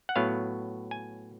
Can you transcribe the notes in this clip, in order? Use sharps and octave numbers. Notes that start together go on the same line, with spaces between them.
F#5
A2 F#3 B3 F5
G#5